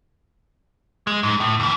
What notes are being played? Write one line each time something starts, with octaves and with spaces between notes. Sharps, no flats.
G#3
G#2
A2
D#2 E3